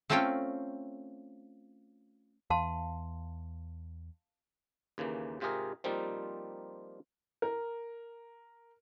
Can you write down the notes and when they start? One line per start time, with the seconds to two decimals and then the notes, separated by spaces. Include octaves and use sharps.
0.10 A3 C4 C#4 F4 C#5 G5
2.50 E2 F5 A5 C6
4.98 D#2 C#3 E3 A#3
5.40 G#2 C3 F4 G4 G#4 A#4
5.84 F3 G3 A#3 C4 D#4 F4
7.42 A#4